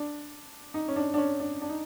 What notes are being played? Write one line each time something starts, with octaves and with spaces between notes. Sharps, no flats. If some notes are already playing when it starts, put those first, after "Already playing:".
Already playing: D4
D#4
C#4
D4
D4
C#4
D4
D4
D#4